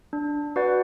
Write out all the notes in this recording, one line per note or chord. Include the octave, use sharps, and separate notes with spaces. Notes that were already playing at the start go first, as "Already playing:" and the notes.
D4
F#4 B4 D5 F#5